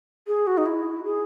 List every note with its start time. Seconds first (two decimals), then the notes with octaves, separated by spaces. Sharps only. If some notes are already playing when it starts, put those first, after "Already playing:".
0.27 G#4
0.47 F#4
0.58 D#4
0.66 E4
1.04 G#4